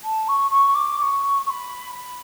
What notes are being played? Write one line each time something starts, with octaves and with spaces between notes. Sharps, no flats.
A5
C#6
C#6
D6
D6
C#6
C#6
B5
B5